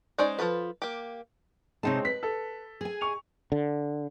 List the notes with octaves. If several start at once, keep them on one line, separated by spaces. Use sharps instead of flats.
G#3 C#4 D#4 C5 D5
F3 F4 A4 B4
A#3 G4
C3 G#3 C4 D#4 C#5 A5
B4 B6
A4
G#4 G#5
C#6 F7
D3